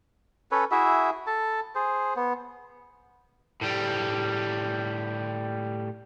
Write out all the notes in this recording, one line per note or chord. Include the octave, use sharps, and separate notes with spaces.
C#4 A4 B4 C#5
E4 F#4 G#4 E5
A4 A5
G#4 C5
B3
A2 G3